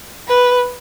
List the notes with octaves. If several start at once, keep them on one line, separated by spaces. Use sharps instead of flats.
B4